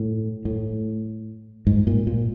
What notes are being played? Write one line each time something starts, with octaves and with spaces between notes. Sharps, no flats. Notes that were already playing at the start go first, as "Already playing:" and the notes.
Already playing: A2
A2
G#2
A#2
A#2